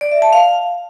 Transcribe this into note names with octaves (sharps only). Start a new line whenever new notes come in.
D5
E5
A5
F5